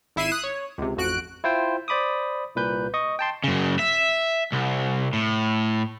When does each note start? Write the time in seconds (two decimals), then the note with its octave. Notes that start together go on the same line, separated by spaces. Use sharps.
0.16 G#1 E4 E5 C7 D#7 E7
0.32 D#6 F#6
0.44 C#5
0.78 C#2 C3
0.97 A1 F2 F#4 F#6 D7
1.44 E4 F4 C5 G5
1.88 C5 D5 B5 D6 D#6
2.55 C2 A#2 B4 G6
2.94 D#5 C#6 D#6
3.19 G5 A5 C6
3.44 F#2 C#3
3.79 E5
4.52 C2
5.13 A2